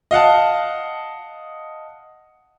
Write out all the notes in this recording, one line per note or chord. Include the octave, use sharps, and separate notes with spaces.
D#5 F5 F#5 A5